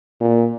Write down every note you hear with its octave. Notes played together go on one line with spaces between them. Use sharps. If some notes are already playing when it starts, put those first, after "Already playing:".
A#2